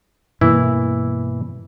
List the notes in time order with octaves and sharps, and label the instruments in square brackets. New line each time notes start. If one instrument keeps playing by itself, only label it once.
[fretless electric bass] G2 B2 A#3 [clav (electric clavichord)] E3 E4